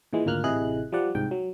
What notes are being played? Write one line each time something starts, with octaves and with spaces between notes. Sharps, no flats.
A#2 E3 G#3
G#1 D2 A#2 A#3 F6 F#6
A1 C3 E4 G#4 D#5 F#6
F3 G3 D5 F#5
C2 G#2 G5
F#3